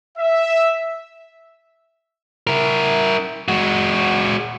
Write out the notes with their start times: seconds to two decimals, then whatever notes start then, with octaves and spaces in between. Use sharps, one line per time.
0.18 E5
2.47 E4 A#4
3.48 G#3 F#4